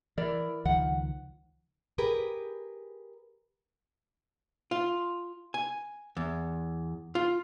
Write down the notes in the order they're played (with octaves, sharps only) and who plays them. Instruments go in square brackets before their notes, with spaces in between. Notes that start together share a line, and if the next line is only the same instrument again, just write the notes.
[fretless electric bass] E3 [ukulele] E4 A#4 D5
[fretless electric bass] C#2 D#3 F3 [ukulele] F#5
[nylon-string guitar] G4 G#4 A#4 B4
[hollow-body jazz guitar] F4
G#5
E2
F4